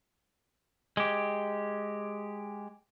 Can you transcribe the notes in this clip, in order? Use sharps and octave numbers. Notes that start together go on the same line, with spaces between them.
G#3 G4